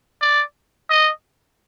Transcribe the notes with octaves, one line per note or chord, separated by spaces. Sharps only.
D5
D#5